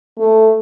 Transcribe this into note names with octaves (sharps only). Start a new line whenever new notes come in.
A3